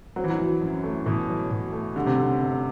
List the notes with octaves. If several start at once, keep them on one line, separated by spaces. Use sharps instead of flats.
F#3 C4
E3
F#3
E3
F#2
A3
B2 E3
F#3
B2
A3
D3 G3
C3
F#2 D3
G1